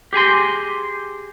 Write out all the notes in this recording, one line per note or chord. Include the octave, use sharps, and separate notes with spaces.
G4 G#4 G#5 C6